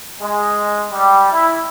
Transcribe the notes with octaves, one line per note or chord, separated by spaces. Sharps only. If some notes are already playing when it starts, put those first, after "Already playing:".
G#3
G3
E4